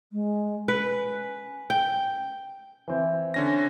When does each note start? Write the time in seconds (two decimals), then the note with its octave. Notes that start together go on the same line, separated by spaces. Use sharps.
0.12 G#3
0.68 C#4 B4
1.70 G5
2.88 E3 C4 E4
3.34 D3 C#4 A#6